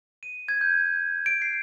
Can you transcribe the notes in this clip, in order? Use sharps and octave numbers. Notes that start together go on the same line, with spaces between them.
D#7
G#6
G6
D7
C7